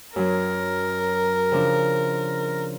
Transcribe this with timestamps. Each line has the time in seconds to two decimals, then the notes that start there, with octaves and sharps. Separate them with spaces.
0.16 F#2 F#3 A#4
1.51 C#3 F3 D4